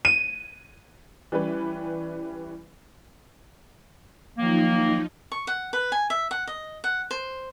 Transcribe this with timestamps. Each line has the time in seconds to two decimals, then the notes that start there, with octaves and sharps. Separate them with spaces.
0.05 D#7
1.32 E3 G3 C#4 B4
4.38 D#3 F3 F#3 A#3 D#4
5.32 C#6
5.47 F#5
5.73 B4
5.92 G#5
6.10 E5
6.31 F#5
6.47 D#5
6.84 F#5
7.11 C5